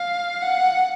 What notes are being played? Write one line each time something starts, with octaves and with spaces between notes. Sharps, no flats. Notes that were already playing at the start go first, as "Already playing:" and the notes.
Already playing: F5
F#5